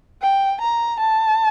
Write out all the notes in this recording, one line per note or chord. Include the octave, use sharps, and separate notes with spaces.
G5
A#5
A5